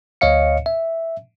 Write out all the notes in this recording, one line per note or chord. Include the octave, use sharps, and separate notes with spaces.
D2 C#5 D#5 F5 C#7
E5